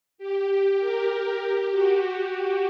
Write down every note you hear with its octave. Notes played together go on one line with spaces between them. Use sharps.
G4
A#4
G4
G4
F#4
G4